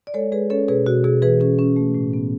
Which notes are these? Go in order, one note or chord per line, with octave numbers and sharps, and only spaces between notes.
D5
G#3 A4 C#5
G#3 G#4 B4
C#4 A4 C#5
B2 G#4 B4
B2 F#4
B2 G#4
E3 G#4 B4
C#4 G#4
C#4
A3
A2
B3